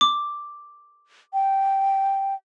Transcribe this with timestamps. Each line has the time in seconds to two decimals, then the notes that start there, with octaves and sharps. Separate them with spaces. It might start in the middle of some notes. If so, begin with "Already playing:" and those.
0.01 D6
1.33 G5